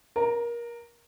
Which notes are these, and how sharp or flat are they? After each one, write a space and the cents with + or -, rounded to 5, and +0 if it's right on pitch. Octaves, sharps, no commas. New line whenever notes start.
A#4 +25 A#5 -15